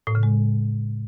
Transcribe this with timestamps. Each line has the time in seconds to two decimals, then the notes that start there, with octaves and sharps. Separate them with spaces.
0.07 A2
0.15 C#3
0.23 G#3